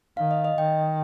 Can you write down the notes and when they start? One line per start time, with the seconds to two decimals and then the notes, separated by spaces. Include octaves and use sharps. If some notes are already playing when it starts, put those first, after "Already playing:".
0.17 D#3 F5
0.31 D#5
0.45 D#5
0.58 D#3 G5